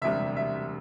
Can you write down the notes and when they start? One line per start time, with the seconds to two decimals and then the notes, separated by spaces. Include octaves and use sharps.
0.02 E1 D2 C3 G3 E5
0.36 E5